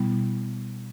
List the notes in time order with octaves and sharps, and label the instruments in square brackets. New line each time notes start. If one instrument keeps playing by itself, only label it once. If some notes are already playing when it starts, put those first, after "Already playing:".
Already playing: [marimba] B2 G3 B3 E4